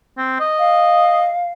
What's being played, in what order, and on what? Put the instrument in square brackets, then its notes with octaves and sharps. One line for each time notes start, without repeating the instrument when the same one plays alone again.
[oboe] C4
D#5
[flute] F5